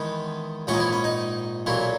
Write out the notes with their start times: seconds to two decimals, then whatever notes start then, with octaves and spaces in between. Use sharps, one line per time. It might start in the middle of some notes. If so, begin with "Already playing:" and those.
Already playing: E2 D#3 G#3 B3 B4
0.67 A#1 G#2 E3 C#4 C#5
0.74 D#4
0.80 E3 E4
0.93 C#4
1.04 D#4
1.66 B1 A#2 E3 F#3 E4